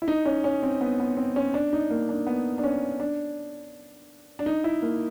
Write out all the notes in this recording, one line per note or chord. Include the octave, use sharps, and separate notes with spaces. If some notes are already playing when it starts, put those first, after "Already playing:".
E4
D#4
C#4
C#4
C4
B3
B3
C4
C#4
D4
D#4
A#3
D4
B3
D4
C#4
D4
D4
D#4
E4
A#3